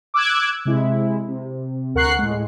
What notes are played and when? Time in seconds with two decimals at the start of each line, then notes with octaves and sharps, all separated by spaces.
0.14 D6 E6 F#6 G#6
0.65 C3 G#3 E4
1.28 C3
1.95 D2 A#4 F#5 C#6 F#6 C7
2.19 A2 G#3